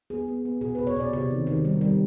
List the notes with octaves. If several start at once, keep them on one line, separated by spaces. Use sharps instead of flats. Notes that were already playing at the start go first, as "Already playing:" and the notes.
B3 G#4
B3
B3
B2 G#4
B4
B2
C#5
B2 D5
C3
D#3
D#3
G3
G3